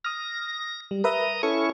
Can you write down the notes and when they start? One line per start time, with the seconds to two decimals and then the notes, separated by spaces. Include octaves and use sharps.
0.04 D#6 F6 A#6
0.91 G3
1.04 A#4 B4 E5 A#5 D#6
1.43 C#4 E4 A4 C#6